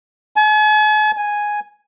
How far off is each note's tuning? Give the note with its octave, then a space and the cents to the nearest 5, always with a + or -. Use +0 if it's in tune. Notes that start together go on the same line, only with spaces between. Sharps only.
G#5 +45
G#5 +0